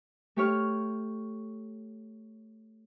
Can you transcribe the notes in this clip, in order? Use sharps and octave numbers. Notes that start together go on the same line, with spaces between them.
A3 G4 C#5 F6